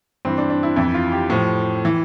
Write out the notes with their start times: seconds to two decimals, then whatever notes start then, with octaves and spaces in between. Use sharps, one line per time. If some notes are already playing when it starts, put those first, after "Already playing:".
0.25 G2 E3 C4
0.38 D4
0.50 D4
0.63 E4
0.76 F2 E3 E4
0.94 F4
1.12 G4
1.30 A2 F3
1.85 E3